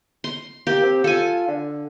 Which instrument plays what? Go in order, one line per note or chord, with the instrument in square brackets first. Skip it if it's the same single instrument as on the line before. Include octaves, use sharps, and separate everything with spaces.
[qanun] C6
[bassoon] A#3 [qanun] G4
[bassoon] C4
[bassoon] F4 [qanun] A4 G#5
[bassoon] D3